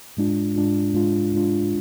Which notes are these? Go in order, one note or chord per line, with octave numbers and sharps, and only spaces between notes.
G#2 G#3 D4 F4
G#2 G#3 D4 F4
G#2 G#3 D4 F4
G#2 G#3 D4 F4